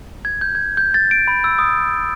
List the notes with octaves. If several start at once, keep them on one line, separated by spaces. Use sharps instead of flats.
G#6
G6
G#6
G6
A6
D7
B5
E6
D#6